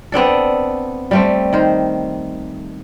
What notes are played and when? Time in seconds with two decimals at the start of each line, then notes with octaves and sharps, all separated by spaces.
0.12 B3 C4 D4 A4
1.11 G3 A3 C4
1.53 D#3 C5